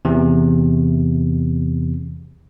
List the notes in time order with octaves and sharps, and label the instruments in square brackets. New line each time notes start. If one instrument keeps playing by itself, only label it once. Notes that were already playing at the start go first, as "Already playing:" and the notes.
[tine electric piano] E2 C3